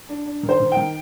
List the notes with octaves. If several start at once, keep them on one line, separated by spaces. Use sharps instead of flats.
D4
D4
D#3
C5
D#3
G5
D#3